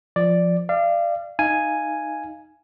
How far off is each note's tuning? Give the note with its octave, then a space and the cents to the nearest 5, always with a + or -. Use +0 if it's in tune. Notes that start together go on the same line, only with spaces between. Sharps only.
F3 +0 D5 +0
D5 +25 F5 -30
D#4 +0 F5 -15 G#5 +0